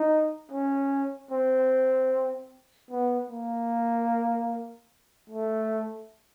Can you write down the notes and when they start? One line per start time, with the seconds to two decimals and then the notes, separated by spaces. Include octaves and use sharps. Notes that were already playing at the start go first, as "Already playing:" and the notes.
Already playing: D#4
0.52 C#4
1.31 C4
2.91 B3
3.30 A#3
5.30 A3